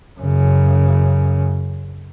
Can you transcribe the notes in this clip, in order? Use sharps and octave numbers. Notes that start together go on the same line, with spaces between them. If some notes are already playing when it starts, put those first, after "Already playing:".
F#2 C#3